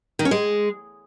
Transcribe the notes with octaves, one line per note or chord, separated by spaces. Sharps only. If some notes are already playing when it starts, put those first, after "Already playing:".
D#3
C#4
G#3